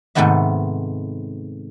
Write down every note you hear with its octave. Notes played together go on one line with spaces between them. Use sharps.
G#2 C3 D#3 A3 B3 E5